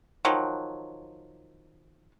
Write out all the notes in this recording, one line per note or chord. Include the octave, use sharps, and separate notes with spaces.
D#3 F3 F#3